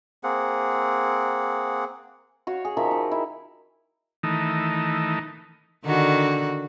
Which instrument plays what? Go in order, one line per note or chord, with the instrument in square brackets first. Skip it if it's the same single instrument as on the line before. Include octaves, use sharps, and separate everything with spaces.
[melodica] A#3 C4 G#4 F#5
[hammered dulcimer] F#4 C#5 F5
G#4
D#3 F3 A#4 E5
D#4
E4
[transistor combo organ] D#3 E3 A3 D#4
[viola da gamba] D3 D#3 F#4